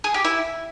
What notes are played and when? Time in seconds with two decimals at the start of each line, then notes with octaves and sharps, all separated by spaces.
0.04 G#4
0.14 G4
0.25 E4